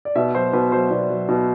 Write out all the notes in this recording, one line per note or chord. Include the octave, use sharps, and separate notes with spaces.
D5
B2 E5
F#3 C5
B2 B4
F#3 C5
B2 D5
F#3
B2